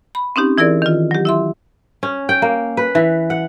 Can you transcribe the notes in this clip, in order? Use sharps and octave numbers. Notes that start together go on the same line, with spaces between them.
B5
C4 C#4 D#4 G4
E3 E4 G#4 A#4 D5
D#3 F4
F#3 G4
E4 E5 C6
C#4
G5
A#3
B4
E3
F#5